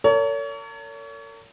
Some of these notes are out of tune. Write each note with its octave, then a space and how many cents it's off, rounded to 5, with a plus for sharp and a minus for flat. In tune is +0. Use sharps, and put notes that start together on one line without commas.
A#4 -45 C#5 +35